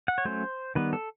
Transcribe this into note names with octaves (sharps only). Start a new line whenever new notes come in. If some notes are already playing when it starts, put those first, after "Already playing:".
F#5
C#5
F#3 A3 C#4 C5
D#3 G3 B3 B4
A4